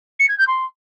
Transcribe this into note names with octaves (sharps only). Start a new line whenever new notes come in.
C#7
G#6
G6
C6